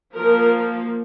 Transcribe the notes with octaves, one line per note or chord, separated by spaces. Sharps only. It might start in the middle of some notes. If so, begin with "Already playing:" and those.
F3 A#3 A#4